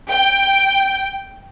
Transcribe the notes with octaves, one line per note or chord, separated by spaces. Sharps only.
G5